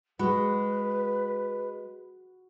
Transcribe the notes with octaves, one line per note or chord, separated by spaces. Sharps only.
G#3 F#4 B4 B5